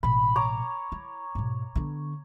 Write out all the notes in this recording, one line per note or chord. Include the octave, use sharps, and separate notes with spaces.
A1 B2 B5
C#5 A#5 D6
E4
G#2 B2
D3 B3